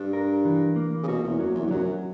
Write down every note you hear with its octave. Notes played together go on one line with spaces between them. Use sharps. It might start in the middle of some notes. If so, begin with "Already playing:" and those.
Already playing: G2 D4
A#4
E3
A#3
C#3
B2 F#4
E2
F#2 F#3
E2
G2
F#2 F#3